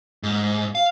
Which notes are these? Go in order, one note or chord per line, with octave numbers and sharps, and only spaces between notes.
G#2
F5